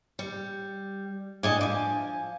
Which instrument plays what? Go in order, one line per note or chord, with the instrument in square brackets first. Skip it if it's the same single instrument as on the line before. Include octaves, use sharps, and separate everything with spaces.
[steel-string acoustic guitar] G3
[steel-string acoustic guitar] A2 D4 D#5 [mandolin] G#5 D6
[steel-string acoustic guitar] F3 [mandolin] G#5 D6